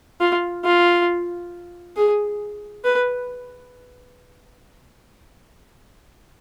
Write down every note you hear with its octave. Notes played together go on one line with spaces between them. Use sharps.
F4
F4
G#4
B4